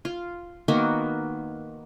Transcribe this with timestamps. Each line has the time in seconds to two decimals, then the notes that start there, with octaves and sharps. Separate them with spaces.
0.05 F4
0.68 D#3 A#3 B3 F#4